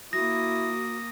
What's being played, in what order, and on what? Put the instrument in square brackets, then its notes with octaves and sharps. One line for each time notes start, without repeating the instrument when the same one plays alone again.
[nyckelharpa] A#3 D#6 [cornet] E4 [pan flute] F#4 [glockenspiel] A#6